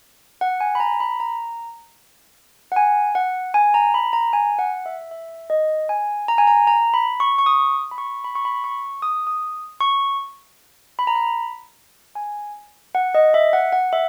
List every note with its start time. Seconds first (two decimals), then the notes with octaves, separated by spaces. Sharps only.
0.41 F#5
0.60 G#5
0.75 B5
0.80 A#5
1.00 B5
1.20 A#5
2.72 F#5
2.76 G#5
3.15 F#5
3.54 G#5
3.74 A#5
3.94 B5
4.13 A#5
4.33 G#5
4.59 F#5
4.86 E5
5.11 E5
5.50 D#5
5.89 G#5
6.28 A#5
6.38 G#5
6.47 A#5
6.67 A#5
6.94 B5
7.20 C#6
7.38 C#6
7.46 D#6
7.91 B5
7.98 C#6
8.24 B5
8.35 C#6
8.45 B5
8.64 C#6
9.02 D#6
9.27 D#6
9.80 C#6
10.99 B5
11.07 A#5
11.16 B5
12.15 G#5
12.95 F#5
13.15 D#5
13.34 E5
13.53 F#5
13.73 F#5
13.93 E5